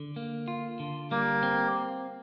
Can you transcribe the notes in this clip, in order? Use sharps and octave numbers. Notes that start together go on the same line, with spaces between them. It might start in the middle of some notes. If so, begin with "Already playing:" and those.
Already playing: D3
A#3
F4
D3
G3 A#3
C4